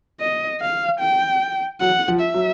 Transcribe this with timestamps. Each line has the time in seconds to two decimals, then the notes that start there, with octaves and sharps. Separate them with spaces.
0.20 D#5
0.61 F5
1.01 G5
1.81 F#3 F#5
2.08 F3
2.21 E5
2.34 F#3